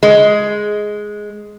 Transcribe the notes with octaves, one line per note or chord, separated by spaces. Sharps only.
G#3